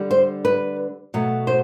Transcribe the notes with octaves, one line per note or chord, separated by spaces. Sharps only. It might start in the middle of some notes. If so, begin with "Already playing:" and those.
Already playing: D3 G3
C5
B4
B2 F#3 A3
C5